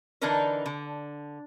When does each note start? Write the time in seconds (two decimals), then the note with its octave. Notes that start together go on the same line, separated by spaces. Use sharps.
0.21 D3 E3 D4 D#4 A#4 B4
0.66 D3